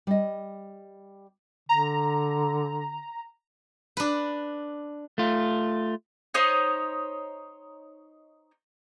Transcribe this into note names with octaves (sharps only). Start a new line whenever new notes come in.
G3 D#5
D3 A#5
D4 B4
A3 F4
D#4 C5 C#5 D#5